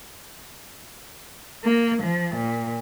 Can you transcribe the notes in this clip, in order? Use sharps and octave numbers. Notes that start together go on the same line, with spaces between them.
A#3
F3
A#2